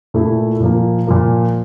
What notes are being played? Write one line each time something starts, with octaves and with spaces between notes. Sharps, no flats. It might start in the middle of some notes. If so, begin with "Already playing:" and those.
A#2 A3 E4
A#2 F3 A#3
A#2 F3 A#3